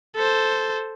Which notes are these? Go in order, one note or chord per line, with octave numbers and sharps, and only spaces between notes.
A4 C5